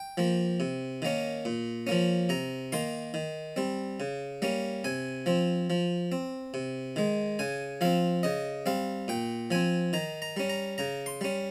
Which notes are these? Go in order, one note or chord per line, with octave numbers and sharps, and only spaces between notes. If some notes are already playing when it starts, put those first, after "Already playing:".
Already playing: G5
F3 A#3
C3
D#3 A#3 C#4
A#2
F3 A#3 C#4
C3 A#5
D#3 A#3 C6
D#3
G3 C4
C#3
G3 A#3 C#4
C3 G#5
F3 C4
F3
C4
C3
D#3 G#3
C#3 G#5
F3 C4 F5
C#3 D#5
G3 C4 F5
A#2 G5
F3 C4 G#5
D#3 A#5
A#5
G3 C#4
A#5
C#3 A#5
C6
G3 C#4